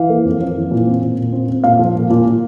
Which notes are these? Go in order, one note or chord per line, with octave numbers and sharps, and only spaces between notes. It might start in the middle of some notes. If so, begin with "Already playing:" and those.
Already playing: E3 F5
A#3
F2
F2
E3
A#2
C4
A#2
A#2
C4
C4
A#2 F5
F3
A#2
A#2
A#2